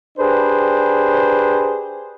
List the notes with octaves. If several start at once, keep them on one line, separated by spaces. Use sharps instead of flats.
D4 G4 G#4 B4 C5